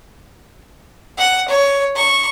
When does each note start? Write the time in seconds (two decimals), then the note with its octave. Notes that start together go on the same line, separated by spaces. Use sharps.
1.18 F#5
1.49 C#5
1.96 C#6